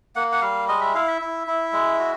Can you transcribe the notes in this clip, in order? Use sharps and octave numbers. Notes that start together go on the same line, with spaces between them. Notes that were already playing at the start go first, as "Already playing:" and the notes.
A#3 F#5
F#5
G3 F5
G#3 D#5
E5
E4 F5
E5
E4
E4
G#3
F#4